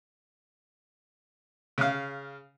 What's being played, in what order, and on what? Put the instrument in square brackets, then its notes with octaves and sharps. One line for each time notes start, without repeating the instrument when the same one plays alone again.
[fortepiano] C#3 F5